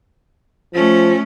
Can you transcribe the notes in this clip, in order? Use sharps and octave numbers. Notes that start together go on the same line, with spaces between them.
F3 A3 C#4